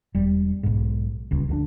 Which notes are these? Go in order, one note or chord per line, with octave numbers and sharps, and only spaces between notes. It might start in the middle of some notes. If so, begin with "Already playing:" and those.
E1 G3
B1 G#2
D#1 C#2
D2 D#3 D4